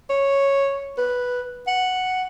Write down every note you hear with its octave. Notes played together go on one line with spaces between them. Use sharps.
C#5
B4
F#5